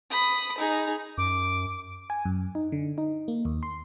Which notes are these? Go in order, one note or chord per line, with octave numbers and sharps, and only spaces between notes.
B5 D#6
D#4 G#4
F#2 D6
G#5
F#2
D#4
D3
D#4
A#3
D#2
C6